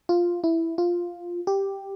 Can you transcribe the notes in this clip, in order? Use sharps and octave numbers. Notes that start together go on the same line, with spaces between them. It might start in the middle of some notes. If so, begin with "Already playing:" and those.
F4
E4
F4
G4